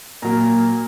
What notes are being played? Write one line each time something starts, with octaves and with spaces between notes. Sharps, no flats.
A#2 F#3 A#3 A#5